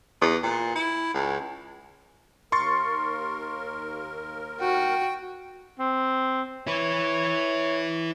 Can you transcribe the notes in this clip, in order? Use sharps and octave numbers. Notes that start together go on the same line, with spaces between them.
E2
A#2
E4
C#2
D#2 A#4 C6 C#6 A6
F#4 G5
C4
E4 B4 C#5